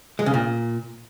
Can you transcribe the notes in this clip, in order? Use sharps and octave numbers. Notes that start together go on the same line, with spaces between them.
G#3
C#3
A#2